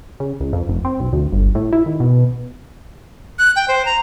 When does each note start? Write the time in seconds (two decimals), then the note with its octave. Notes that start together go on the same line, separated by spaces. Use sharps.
0.20 C#3
0.40 C#2
0.53 F2
0.69 F1
0.85 C4
1.00 B1
1.13 D2
1.32 G1
1.55 A2
1.73 E4
1.86 D#3
2.00 B2
3.39 F#6
3.56 G5
3.68 C5
3.85 A#5